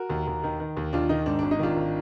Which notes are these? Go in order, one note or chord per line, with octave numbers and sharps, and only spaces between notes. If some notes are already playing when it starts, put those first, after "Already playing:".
Already playing: F#4 A#4
D#2
D#2
D#3
D#3
D#2
D#2 D4 F4
D#3 D#4
G#2 D4
D4
G#1
D#4
D#3 D4 F4
G#1